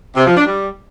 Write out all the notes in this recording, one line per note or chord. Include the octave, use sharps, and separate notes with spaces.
C3
F3
D4
G3